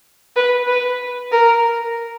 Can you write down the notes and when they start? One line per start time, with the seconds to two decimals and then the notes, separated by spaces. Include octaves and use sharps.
0.36 B4
0.67 B4
1.32 A#4